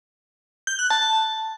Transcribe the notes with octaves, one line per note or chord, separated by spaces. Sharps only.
G6
F#6
A5